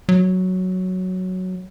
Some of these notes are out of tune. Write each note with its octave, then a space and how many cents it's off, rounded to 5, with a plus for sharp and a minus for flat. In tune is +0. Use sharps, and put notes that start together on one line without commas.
F#3 +0